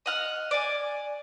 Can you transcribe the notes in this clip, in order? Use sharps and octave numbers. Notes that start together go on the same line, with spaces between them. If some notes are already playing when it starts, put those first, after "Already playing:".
D#5 F#5 F6
D5 G#5